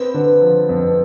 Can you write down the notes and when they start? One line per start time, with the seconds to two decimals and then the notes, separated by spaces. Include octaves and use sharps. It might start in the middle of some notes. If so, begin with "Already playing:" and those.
Already playing: C4 B4
0.14 D3
0.42 F3
0.69 F2